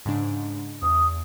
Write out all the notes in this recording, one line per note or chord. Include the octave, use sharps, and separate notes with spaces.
G#2 C#3 D4
E2 D#6